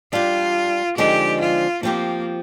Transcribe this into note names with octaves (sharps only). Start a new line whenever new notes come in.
G3 D4 F4 G4
D3 F3 G#3 C4 D#4 G4
F4
F3 A#3 C4 G4